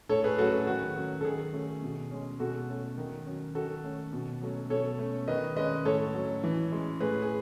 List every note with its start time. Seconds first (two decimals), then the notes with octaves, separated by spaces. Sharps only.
0.09 A2 A4 C#5
0.24 G#4 B4
0.38 F#3 A3 C#4 F#4 A4
0.53 G#4
0.67 D#3 F#4
0.96 F#3 C#4
1.21 A4
1.25 D#3 G#4
1.53 A3 C#4
1.82 B2
2.11 G#3 C#4
2.40 B2 F#4 A4
2.69 A3 C#4
2.98 D#3
3.26 F#3 C#4
3.55 D#3 F#4 A4
3.84 A3 C#4
4.13 B2
4.42 F#3 A3 C#4
4.70 B2 A4 C#5
4.99 A3 C#4
5.28 D#3 B4 D#5
5.56 G#3 C#4 B4 D#5
5.85 A2 A4 C#5
6.14 F#3 C#4
6.44 E3
6.72 G#3 C#4
7.00 A2 G#4 B4
7.22 G#4